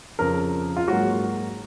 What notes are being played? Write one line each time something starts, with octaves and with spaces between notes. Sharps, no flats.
F2 C#3 F3 A#4
F4
G#2 F#3 A#3 F#4